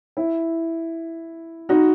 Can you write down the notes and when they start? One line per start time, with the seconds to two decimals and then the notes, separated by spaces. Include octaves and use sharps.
0.17 E4
1.69 D#4 F#4